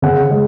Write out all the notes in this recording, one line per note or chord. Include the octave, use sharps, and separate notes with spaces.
C#3 F#5
G#3